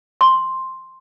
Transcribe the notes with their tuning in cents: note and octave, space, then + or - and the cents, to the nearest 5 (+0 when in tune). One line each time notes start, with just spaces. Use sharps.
C6 +5